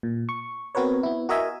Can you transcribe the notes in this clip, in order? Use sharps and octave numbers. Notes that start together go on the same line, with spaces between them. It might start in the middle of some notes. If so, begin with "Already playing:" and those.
A#2
C#6
B3 C4 F#4 A#4 B4 C#5
B3 E4
F#4 A#4 D#5 E5 G#5